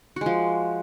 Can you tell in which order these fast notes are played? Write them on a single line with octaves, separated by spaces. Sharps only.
F#4 G#3 F3